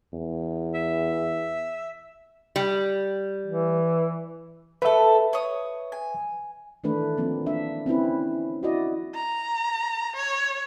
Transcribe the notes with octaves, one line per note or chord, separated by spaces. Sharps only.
E2
E5
G3
E3
A3 A4 B4 E5
C#5 D#6
G#5
D#3 E3 A3 D4 B4
F3 A#3 C4
D4 E5
C4 C#4 E4 B4
E4 F#4 D5 D#5
A#5
C#5